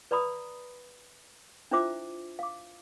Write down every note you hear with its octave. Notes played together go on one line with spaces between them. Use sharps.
B4 D5 A#5 B5 D#6
D4 E4 F4 C5 E5 D6
F5 D6